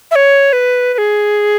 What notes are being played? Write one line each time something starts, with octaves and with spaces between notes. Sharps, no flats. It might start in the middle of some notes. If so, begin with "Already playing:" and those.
E5
C#5
B4
B4
G#4